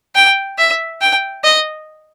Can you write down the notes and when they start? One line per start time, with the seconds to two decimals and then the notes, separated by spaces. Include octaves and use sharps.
0.15 G5
0.58 E5
1.01 G5
1.44 D#5